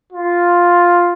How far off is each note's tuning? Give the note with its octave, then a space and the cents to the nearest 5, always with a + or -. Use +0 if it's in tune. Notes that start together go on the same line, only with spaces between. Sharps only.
F4 +5